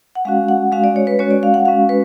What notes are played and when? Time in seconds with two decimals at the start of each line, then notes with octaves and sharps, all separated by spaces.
0.15 F#5
0.25 G#3 C#4 F#4 F5
0.49 F#5
0.72 G#3 C#4 F#4 F5
0.84 D5
0.96 C#5
1.07 B4
1.19 G#3 C#4 F#4 C#5
1.31 D5
1.43 F5
1.54 F#5
1.65 G#3 C#4 F#4 F5
1.89 B4